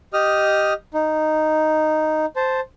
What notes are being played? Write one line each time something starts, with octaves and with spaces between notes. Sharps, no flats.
G4 D#5 D#6 F6
D#4
C5 A5